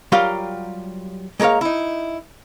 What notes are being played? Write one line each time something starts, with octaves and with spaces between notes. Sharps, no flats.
F#3 G3 F4 G4 A#4 F5
G#3 A#3 A#4 C#5 F5
D#4 E4